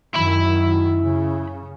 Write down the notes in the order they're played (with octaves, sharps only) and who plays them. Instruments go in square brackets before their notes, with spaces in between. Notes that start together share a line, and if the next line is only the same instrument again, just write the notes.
[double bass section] F#2 D#3 [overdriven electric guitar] E4 B5
[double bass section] C#3